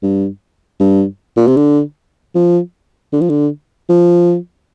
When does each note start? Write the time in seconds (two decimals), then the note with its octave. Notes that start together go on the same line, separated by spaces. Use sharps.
0.03 G2
0.80 G2
1.37 A#2
1.47 C3
1.57 D3
2.35 F3
3.13 D3
3.21 F3
3.29 D3
3.89 F3